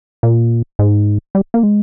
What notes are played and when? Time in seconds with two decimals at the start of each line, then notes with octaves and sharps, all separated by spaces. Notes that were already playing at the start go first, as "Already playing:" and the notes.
0.23 A#2
0.79 G#2
1.35 G3
1.54 A#3
1.63 G#3